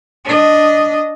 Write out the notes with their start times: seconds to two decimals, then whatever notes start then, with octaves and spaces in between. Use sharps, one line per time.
0.25 D4 D#5